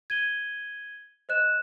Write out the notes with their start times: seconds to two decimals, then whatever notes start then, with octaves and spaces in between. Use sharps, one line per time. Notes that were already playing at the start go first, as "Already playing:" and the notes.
0.10 G#6 D#7 G7
1.29 C5 D#5 F#6 E7